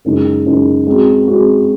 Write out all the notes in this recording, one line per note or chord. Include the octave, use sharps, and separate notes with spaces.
F#2 C#3 G#3 D#4
F#2 C#3 G#3 D#4
G#3 C4 F#4
G#3 C4 F#4